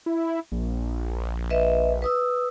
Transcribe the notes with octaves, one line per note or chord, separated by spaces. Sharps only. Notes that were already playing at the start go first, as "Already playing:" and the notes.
E4
A#1
B4 D#5 E5
B4 D#6 E6